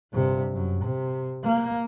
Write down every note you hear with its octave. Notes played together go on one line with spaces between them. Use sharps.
G1 C3
F#2
C3
A#3